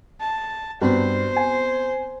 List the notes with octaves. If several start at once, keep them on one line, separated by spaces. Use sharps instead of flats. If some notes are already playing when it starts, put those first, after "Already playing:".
A5
G2 B3 C4 F#4 C5
G#5